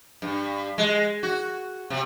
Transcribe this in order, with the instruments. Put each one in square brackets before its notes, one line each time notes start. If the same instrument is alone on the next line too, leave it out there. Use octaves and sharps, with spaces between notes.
[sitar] G2
G#3
F#4
C3